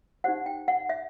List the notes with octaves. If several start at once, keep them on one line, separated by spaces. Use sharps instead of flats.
D#4 G4 C5 F#5
G5
F#5
E5